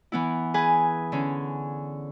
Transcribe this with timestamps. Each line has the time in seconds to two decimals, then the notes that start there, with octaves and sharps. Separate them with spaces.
0.12 E3 B3 E4
0.54 G#4 B4 G#5
1.12 D3 C#4